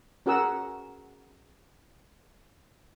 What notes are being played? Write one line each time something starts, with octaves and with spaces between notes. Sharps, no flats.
C#4 F#4 G#4 A#4 F#5 E6